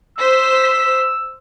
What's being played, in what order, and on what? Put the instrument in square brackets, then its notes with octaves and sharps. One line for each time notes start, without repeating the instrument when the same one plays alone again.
[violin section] C5 B6 [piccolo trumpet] E6